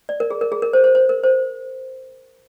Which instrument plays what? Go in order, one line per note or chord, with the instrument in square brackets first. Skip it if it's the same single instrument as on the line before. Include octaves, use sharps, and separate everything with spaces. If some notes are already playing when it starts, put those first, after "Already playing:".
[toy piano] D5
A#4
G#4
A#4
G#4
A#4
C5
C5
C5
A#4
C5